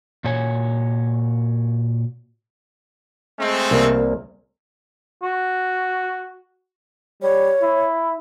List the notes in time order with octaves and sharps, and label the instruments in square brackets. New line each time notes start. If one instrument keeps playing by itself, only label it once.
[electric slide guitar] A#2 F#4 C#5 G#5
[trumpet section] G#3 A3 C4
[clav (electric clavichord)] C2 A#3
[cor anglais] F#4
[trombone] G3 [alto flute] C#5
[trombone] E4